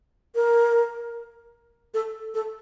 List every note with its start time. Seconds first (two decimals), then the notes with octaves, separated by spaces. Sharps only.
0.35 A#4
1.94 A4
2.35 A4